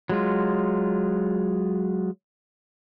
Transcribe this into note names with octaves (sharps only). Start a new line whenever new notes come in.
F#3 G#3 F4